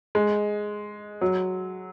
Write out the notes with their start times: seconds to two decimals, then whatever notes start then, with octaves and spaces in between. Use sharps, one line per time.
0.15 G#3
1.21 F#3